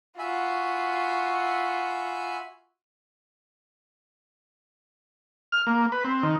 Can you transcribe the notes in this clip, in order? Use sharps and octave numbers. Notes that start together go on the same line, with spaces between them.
F4 F#4 E5 G#5 B5
F6
A#3
B4
C4
D#3